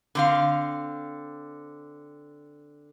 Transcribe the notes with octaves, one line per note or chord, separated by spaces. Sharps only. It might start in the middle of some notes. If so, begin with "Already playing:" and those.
D3 C4 F5